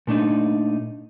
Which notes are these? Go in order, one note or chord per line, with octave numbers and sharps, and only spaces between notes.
A#2 A3 D4 D#4